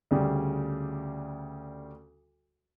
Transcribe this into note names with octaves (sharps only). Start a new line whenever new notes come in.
D2 C#3 G3